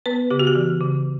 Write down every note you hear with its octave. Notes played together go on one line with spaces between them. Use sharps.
B3 B4
C#3 G4
F#4
G4
E3
C#3